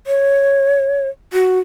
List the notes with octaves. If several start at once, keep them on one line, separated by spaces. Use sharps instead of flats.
C#5
F#4